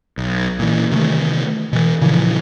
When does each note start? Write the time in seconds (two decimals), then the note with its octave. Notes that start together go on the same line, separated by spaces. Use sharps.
0.18 B1
0.59 A#2 E3
0.92 C3 D#3 E3 A3
1.73 B2 E3
2.01 A#2 C#3 E3 F3